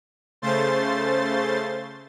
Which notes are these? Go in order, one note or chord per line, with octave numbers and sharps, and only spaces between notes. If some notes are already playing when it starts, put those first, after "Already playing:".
C#3 A3 C5 C6 A6